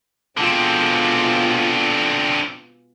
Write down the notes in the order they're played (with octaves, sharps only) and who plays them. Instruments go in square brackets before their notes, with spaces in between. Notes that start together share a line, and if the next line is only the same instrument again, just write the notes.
[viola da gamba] B2 G#3 F4 [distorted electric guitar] D3 C4